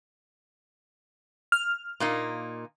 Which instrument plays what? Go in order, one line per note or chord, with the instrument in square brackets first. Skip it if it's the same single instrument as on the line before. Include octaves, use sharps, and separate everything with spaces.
[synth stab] F6
[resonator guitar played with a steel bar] A#2 A#3 D#4